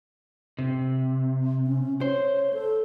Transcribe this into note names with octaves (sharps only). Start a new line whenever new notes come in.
C3
C#4
C5 C#5
A4